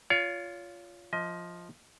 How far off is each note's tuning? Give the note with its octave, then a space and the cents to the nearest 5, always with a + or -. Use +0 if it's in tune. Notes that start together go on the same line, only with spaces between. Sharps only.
F4 +0 C#5 +35
F3 +0 D#5 +25